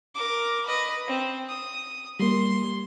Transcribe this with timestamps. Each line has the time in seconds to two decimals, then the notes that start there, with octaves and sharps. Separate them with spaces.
0.15 A#4 D6
0.65 B4 D#5
1.07 C4
1.49 D#6
2.20 G3 A#3 C6